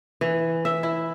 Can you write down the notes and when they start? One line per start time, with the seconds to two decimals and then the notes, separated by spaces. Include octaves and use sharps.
0.21 E3
0.65 E5
0.83 E4